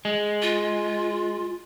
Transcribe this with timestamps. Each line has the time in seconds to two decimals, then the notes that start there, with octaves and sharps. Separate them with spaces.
0.05 G#3
0.42 F4